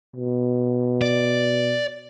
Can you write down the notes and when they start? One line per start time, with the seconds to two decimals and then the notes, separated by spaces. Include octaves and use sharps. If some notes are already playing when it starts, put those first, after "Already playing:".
0.16 B2
1.02 D5